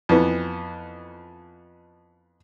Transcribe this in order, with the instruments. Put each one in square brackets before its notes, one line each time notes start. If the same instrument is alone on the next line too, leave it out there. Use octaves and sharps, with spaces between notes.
[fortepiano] F2 E3 B3